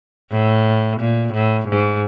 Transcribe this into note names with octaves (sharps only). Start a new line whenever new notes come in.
A2
A#2
A2
G#2